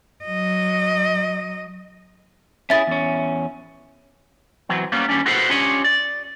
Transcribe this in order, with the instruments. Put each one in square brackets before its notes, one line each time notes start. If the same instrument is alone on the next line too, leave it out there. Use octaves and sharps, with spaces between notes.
[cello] F#3 D#5
[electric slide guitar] C#4 E4 G#4 [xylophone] E5 A6
[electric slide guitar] E2 C#4
[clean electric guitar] E3 F#3 C4
G3 A#3 B3 C#4
D#2 F3 G3 C#4 D4
F4 F#4 G#4 A4 B4 C5
C#4 D4 F4 G4 C#5 D#5
D5